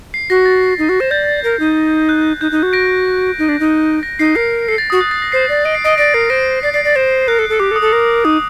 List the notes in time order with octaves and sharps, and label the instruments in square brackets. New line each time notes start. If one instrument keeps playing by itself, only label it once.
[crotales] C7
[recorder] F#4 [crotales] A#6
[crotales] A6
[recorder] D#4
F#4
C5
[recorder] D5 [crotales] G6
[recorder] A#4
D#4
[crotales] F#6
[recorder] D#4 [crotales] G6
[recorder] D#4
F#4
[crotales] A#6 D7
[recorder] D#4
D4
D#4
[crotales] A#6
[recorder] D#4 [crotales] C7
[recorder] A#4 [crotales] C7
[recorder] A4 [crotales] C7
[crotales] A6
[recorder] F#4 [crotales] D#6
[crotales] F#6
A6
A#6
[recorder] C5 [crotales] C7
[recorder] D5
[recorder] D#5 [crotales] D7
[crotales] C7
[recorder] D#5 [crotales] A#6 D7
[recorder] D5 [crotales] A#6 D7
[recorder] A#4 [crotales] C7
[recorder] C5 [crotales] A#6 D7
[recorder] D5 [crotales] C7
[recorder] D5 [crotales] C7
[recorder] D5
C5
[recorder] A#4 [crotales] F#6
[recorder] A4
A4
[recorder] G4 [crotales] D6
[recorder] A4
[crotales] D#6
[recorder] A4
A#4
[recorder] D#4 [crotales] D#6